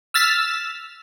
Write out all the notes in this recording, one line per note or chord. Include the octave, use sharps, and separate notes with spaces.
E6 F6 A6 B6